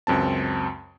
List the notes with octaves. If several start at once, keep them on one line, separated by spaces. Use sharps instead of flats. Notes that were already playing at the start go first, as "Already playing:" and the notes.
C#2 F#2 C4 A5